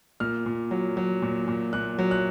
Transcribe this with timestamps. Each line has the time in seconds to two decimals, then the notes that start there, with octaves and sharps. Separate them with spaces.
0.20 A#2 F6
0.46 A#2
0.71 F#3
0.97 F#3
1.22 A#2
1.48 A#2
1.73 A#2 F#6
1.99 F#3
2.11 F#6